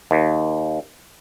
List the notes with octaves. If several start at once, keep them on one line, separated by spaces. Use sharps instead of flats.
D#2